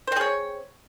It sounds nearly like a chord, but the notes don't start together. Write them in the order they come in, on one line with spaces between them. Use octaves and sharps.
C5 C4 G#4 C#5